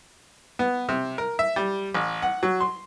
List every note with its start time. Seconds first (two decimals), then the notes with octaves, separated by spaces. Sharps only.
0.59 B3
0.89 C3
1.18 A#4
1.39 E5
1.56 G3
1.94 A1
2.22 F#5
2.43 F#3
2.61 C6